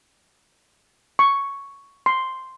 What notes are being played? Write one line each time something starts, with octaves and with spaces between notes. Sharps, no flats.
C#6
C6